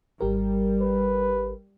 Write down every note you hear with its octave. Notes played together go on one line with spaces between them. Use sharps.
G#1 G3 G4 A#4
B4